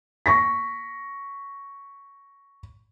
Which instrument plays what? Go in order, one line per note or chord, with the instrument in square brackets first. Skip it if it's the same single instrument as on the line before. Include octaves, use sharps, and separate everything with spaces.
[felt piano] C#6 A#6 B6